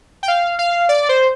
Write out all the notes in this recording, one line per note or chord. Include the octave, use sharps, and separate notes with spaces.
G5
F5
F5
D5
C5